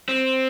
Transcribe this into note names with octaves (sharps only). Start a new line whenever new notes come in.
C4